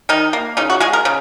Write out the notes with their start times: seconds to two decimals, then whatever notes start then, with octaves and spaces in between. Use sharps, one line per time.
0.09 D#3 D#4
0.33 A#3
0.57 C#3 D#4
0.70 F#4
0.80 G#3 G#4
0.93 A#4
1.05 C#3